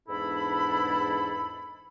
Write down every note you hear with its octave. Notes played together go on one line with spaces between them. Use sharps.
E2 G#2 D4 E4 A4 B5